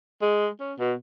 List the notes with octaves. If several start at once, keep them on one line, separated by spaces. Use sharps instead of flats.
G#3
C#4
B2